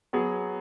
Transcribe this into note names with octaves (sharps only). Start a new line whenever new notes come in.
F#3 B3 G#4